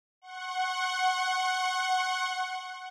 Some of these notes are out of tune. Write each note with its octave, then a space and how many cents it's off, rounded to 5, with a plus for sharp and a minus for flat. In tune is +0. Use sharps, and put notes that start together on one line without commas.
F#5 +5 C#6 -45